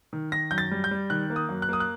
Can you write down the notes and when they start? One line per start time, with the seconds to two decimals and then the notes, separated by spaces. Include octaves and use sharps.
0.13 D#3
0.32 D#3 A#6
0.51 F#2 G6
0.58 A6
0.71 G3
0.84 G6
0.91 G3
1.10 D#3 F#6
1.30 A#3
1.36 D#6
1.49 F#2
1.62 F#6
1.69 A#3 D#6
1.80 F#6